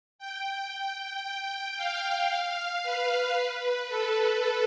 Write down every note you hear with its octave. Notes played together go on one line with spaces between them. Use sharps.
G5
G5
F5
B4
A4